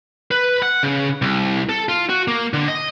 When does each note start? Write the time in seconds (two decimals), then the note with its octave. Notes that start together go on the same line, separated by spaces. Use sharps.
0.31 B4
0.62 F#5
0.83 C#3
1.22 C2
1.69 A4
1.89 F4
2.10 F#4
2.28 A#3
2.53 D3
2.68 D#5